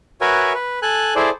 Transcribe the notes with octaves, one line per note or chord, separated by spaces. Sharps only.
F#4 A#4 B4 C#5 E5 G#5
B4
A4 G#5 F#6
E4 G#4 A4 C5 D5